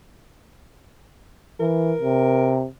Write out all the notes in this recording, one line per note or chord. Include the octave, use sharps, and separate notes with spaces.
E3 A#4
C3